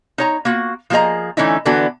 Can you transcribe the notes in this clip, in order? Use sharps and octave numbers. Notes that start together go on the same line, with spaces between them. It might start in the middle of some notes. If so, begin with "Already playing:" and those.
D#4 C#5 A#5
A#3 F4 F#4
F3 A#3 F#4 G#4 D#5 A#5
D3 E3 A3 C#4 D#4 E4
D3 E3 B3 D4 F#4 A4